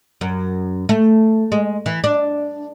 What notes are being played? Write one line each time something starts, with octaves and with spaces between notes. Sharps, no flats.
F#2
A3
G#3
E3
D4